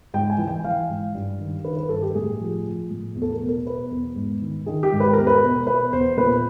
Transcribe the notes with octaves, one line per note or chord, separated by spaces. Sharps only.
G#2 G5
G#5
E3
G5
E3 F5
G#2
G2
D#3
D#3 B4
B4
G2 A4
G4
A2 G#4
F3
F3
A2
E2
A4
A#4
B2
A#4
B2 B4
E2
G#2
D#3
D#3 G#4
G4
G#2
B4
E2 A#4
B4
B2
B2 B4
E2 C5
A#2 B4